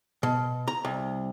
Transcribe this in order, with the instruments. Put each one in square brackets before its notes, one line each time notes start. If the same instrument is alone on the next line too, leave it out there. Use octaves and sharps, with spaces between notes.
[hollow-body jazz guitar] B2
A#5
C2